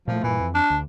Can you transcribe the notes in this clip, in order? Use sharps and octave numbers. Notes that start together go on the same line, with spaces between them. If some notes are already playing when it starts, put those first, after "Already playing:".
A#2 F3 A3
G2 A#2 E3
F2
D4
D2